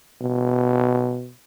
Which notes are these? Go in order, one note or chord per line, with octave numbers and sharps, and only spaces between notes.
B2